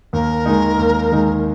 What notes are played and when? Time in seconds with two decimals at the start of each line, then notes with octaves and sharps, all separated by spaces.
0.13 D#2 A#4
0.46 D#3 G#3 D#4
0.79 D#2
1.12 D#3 G#3 D#4